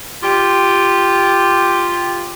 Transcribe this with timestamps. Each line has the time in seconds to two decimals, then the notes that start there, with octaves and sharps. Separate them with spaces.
0.21 F4 G4